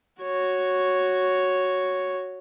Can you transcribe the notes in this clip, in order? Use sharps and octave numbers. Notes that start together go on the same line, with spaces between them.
F#4 C#5